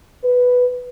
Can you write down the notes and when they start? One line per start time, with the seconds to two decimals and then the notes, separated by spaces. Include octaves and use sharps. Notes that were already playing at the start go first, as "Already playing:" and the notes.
0.24 B4